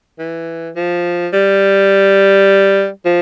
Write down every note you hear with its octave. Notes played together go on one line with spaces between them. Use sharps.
E3
F3
G3
F3